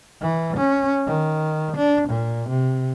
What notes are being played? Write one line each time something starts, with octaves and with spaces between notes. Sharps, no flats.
E3
C#4
D#3
D4
A#2
C3